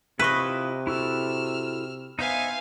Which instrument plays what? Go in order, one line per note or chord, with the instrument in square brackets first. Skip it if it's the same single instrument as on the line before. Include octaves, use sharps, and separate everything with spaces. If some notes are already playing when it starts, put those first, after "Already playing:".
[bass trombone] C3 [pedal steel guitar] E4 F4 C#6 [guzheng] B4 D#5
[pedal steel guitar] E4 F#4 A4 [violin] E6 F6
[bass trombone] B3 [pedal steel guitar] D#4 C5 E5 [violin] F5 G#5